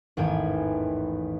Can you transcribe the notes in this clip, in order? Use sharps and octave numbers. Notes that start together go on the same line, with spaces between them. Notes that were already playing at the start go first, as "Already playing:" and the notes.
A1 E2 G#2 D#3 G5 G#5